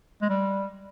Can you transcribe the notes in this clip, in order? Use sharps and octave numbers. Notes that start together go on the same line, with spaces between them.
G#3
G3